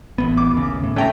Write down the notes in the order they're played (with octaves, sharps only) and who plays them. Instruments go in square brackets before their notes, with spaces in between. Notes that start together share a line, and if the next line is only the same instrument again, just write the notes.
[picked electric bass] A1 B3
[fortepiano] D6
[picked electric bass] D#2 C#3
A2
[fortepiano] A3 G5 A#5 [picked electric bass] C#4